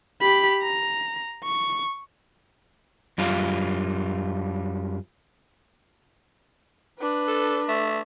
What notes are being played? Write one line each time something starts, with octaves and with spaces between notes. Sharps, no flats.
G4 B5
A#5
C#6
F#2 G3 F4
D4 B4
A4
A3